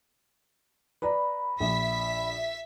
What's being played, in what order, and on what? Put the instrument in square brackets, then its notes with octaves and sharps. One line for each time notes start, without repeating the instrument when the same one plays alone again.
[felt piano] B4 D5 A#5 [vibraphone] B5
[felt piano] A#1 [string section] E5 B6